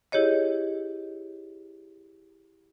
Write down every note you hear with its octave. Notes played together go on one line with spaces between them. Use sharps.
E4 G4 G#4 C#5 D#5